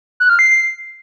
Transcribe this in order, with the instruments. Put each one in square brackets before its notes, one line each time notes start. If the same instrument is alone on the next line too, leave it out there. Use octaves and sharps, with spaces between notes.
[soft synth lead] F#6
F6
C7